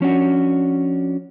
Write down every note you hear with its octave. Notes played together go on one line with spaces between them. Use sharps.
F3 C#4 D4 F#4